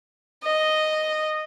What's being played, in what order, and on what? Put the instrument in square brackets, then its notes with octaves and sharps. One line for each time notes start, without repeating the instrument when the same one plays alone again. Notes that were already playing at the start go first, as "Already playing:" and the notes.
[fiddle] D#5